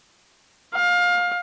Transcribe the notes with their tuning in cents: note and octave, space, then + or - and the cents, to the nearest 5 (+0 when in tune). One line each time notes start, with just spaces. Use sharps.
F5 +25